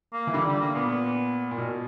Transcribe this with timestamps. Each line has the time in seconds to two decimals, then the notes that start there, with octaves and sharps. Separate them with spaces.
0.13 A#3
0.27 E3
0.34 D3 G3
0.47 G3
0.61 A#3
0.75 A#2 B3
1.51 A#2
1.58 B2